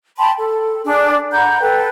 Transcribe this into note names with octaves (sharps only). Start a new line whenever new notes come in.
G5 A5 B5 C6
A4
D4 G#4
F#5 A#5 B5 G6
A4 B4 G5